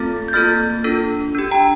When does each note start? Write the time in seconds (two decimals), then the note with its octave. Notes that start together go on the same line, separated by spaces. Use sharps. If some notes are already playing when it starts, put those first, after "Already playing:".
Already playing: A3 C4 F4 A4 F6 A6
0.28 G6
0.33 A#3 F4 A4 F6 A6
0.84 D4 F4 A4
1.35 D4 G4
1.51 G5 A#5